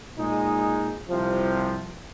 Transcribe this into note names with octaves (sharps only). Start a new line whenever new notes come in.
A#2 G#3 D#4
C2 C3 F3